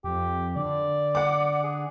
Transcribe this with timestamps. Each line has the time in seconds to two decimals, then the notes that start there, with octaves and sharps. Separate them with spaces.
0.04 F2 G4
0.56 D3 D5
1.15 F#5 D6
1.63 G#4